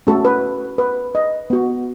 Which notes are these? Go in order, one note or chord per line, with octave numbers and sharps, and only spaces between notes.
A3 C#4 F#4 A4
B4
B4
D#5
B3 F#4